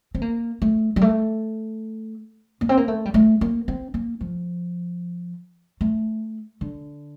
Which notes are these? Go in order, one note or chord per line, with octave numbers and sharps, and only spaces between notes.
C4
A#3
A3
G3
A3
A#3
C4
A#3
A3
G3
A3
A#3
C4
A#3
F3
A3
D3